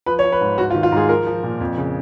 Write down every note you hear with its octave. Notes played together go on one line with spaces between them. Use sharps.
F3 B4
C#5
F3
B4
G#2
G#2 F#4
F4
D#3
F4
G#2 G#4
F3 A#4
F3
A#2
F2
C#3